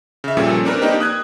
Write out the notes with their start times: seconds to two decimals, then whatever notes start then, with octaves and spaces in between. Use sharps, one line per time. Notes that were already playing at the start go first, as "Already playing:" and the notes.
0.24 C#3 E5
0.37 A#2 F3 G3 C#4 A4
0.65 C4 D4 A#4 B4
0.81 A#3 D4 D#4 G4
1.00 D#6 F#6 G#6